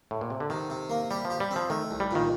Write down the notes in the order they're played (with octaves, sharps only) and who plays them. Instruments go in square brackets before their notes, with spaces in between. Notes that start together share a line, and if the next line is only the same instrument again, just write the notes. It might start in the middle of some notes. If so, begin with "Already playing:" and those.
[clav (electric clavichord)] A2
A#2
C3
D3
[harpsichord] C3 [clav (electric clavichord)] D#3
[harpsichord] C3
A#3
[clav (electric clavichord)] G3 [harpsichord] G4
[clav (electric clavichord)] F3
[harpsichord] G4
[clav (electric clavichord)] G3
[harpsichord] C4
[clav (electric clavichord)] F3
[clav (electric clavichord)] D#3 [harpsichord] A3
[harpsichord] C2
[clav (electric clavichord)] G3
[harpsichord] A#2 [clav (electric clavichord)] D#3